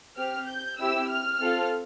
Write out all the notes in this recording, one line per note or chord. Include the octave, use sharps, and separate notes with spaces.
C4 G4 F6
G6
C4 E4 G4 E6
F6
C4 F4 A4